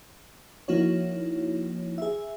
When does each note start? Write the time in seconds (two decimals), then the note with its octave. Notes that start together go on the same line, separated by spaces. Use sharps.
0.68 F3 A#3 D#4 E4 F#4 C#5
1.98 G#4 E5